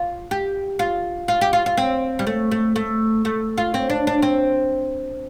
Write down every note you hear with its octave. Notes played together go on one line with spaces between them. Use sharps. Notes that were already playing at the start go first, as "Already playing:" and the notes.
Already playing: F4
G4
F4
F4
G4
F4
F4
C4
G3
A3
A3
A3
A3
F4
C4
D4
D4
C4